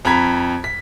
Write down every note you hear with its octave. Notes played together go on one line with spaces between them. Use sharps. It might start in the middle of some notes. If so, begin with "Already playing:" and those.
F2 A#5 B5 G#6 B6
B6